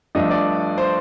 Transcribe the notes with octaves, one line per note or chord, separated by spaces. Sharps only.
G2 F3 A3 D4 D#5
D5
C5